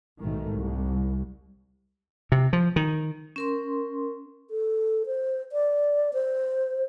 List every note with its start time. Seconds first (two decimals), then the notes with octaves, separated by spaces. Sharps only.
0.19 B1 G#2 D#3 A3
0.53 C2
2.32 C3
2.53 F3
2.76 D#3
3.36 C#4 A#4 C6
4.50 A4
5.06 C5
5.52 D5
6.14 C5